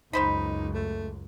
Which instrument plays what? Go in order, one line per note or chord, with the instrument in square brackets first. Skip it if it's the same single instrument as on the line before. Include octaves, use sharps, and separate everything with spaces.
[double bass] C#2 F#2 [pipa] D#3 C5 B5 [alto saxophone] D#4
[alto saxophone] A3